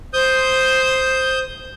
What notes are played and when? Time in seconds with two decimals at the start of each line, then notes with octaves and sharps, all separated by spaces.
0.13 C5 D#6 G6